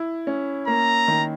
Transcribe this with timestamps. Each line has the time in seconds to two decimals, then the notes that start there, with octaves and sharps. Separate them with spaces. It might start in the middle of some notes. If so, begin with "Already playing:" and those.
Already playing: E4
0.27 C#4
0.67 A#3 A#5
1.08 D#3